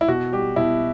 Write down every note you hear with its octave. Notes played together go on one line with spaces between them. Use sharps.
E4
B2 F#4
G3 G4
B2 E4